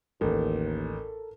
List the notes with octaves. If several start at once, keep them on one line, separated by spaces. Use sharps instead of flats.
A1 D#2 A4 A#4